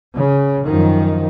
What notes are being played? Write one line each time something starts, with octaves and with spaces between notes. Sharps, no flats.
C#3
F#2 D#3 F3